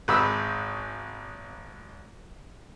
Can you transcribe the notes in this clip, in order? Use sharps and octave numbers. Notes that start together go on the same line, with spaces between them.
G#1 G#2 B5 E6